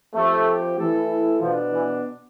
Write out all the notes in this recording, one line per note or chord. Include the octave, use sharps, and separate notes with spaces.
F3 A3 C4 G4
E3 A3 E4 A4
B2 F3 B3 D4
E3